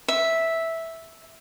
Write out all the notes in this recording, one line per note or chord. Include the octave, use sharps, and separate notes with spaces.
E5